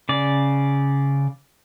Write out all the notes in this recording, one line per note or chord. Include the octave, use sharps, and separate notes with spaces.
C#3 D5